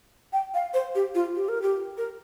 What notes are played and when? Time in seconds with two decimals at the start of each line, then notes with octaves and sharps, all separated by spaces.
0.33 G5
0.54 F5
0.74 C5
0.95 G4
1.15 F4
1.35 G4
1.49 A#4
1.62 G4
1.97 A#4